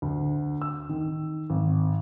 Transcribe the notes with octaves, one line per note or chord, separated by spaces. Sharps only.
D2
E6
D#3
G#1